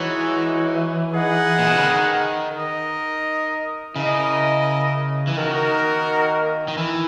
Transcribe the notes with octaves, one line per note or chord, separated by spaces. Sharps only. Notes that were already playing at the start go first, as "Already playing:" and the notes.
Already playing: E3 G#3 D#4 F#4 C#5
D#4 G#4 B4 D#5 F#5
A#2
B2
C#3
D#3
D#4 A#4 D#5
C#3 E4 A#4 D#5
E3
D#3 A#3 D#4 F#4 A#4
D#3
E3 E4